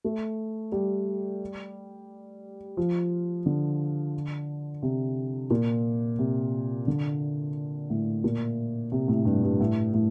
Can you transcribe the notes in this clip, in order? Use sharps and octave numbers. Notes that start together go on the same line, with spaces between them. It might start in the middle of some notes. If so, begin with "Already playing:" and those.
A3
G3
F3
D3
C3
A#2
C3
D3
A2
A#2
C3
A2
G2
G2
A2
A2